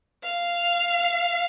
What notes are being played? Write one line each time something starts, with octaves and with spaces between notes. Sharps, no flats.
F5